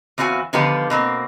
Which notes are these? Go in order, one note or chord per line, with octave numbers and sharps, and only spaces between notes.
E2 C4 F4 F#4 G#5
D3 D#3 F3 B3 F4 G4
B2 A#3 C4